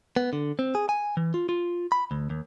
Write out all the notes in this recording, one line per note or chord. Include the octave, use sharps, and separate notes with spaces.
B3
D3
C4
G#4
G#5
E3
F4
F4
B5
D2
D#2